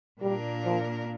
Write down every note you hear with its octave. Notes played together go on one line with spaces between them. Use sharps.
A#2 G3 A#3 D4 A#4
F3